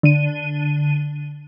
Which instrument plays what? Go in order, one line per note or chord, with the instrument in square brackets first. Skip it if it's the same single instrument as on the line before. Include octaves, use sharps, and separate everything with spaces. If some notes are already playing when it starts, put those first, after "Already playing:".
[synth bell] D3 D#7